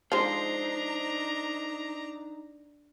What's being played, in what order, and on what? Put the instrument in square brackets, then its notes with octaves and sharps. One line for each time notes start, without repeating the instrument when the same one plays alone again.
[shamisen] F3 G#3 [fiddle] D4 A#5 [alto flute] D#4 [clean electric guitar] C5